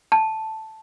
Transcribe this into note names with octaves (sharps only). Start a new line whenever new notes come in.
A5